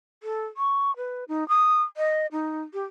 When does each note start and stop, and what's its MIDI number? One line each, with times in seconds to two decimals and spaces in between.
0.23 0.46 69
0.57 0.95 85
0.97 1.24 71
1.28 1.47 63
1.49 1.82 87
1.97 2.26 75
2.32 2.63 63
2.73 2.83 67